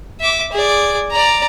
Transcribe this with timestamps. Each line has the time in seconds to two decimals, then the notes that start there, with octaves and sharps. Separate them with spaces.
0.21 E5 D6
0.52 G#4 D5
1.11 D5 A#5